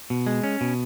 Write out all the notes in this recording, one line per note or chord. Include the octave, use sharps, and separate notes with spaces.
B2
G#3
C#4
B2